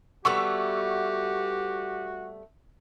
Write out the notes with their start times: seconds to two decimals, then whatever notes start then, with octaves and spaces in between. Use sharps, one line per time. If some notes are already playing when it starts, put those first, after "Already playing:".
0.25 G3 A3 B3 F#4 G4 C#6 E6